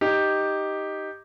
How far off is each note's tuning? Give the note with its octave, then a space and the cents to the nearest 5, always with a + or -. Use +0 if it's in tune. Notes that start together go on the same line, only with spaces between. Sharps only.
D#4 +0 G4 +0